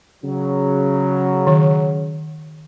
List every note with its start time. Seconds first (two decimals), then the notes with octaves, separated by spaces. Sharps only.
0.24 C#3 F#3
1.47 D#3